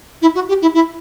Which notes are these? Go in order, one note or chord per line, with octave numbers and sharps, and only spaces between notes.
E4
F#4
G4
E4
E4